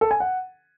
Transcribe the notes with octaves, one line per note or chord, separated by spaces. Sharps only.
A4
G#5
F#5